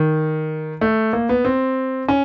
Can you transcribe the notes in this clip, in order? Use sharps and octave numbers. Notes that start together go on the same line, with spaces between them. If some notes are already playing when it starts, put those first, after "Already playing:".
Already playing: D#3
A3
A#3
B3
C4
C#4